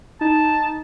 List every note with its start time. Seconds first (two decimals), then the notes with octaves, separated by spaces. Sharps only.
0.21 D#4 A5